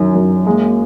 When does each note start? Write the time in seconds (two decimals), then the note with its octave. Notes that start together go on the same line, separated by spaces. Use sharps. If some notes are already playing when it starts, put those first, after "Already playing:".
Already playing: F#2 D#3 F#3
0.15 F#2
0.46 G#3 A#3